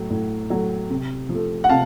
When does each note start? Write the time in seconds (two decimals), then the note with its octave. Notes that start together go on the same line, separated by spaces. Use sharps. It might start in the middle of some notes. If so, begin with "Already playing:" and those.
Already playing: A2 F#3 A3
0.10 A2
0.50 F#3 A3
0.90 C3
1.29 F3 A3
1.64 F#5
1.69 C3 F5 A5